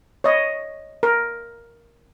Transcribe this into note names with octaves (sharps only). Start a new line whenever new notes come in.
C#5 D#5
A#4